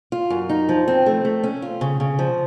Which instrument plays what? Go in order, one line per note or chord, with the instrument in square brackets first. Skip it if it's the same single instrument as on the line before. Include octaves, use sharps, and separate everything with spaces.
[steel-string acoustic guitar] F4
F#2
D#4
F3
C4
A3
A3
C#4
F4
C#3
C#3
F3